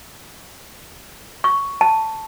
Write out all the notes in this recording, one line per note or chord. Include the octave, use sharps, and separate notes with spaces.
C#6
A5